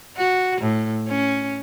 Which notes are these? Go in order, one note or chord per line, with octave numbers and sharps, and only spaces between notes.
F#4
A2
C#4